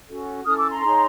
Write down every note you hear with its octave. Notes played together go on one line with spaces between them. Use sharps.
C#4 F#4 A4
C#4 E4 A4 D#6 F6
D6 E6
A#5 C6
D#4 G#4 C#5